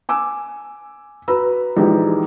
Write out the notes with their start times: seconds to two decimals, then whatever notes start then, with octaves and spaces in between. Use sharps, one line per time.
0.09 G#5 D6 E6
1.28 F#4 B4 A#5 B5 E6
1.77 A#1 E3 G#3 D#4 G4 B4